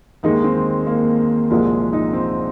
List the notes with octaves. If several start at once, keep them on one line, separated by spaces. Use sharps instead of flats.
D#2 D#3 G#3 D#4
C4
A#3
C2 A#2 F3 G#3 A#3
D#4
C4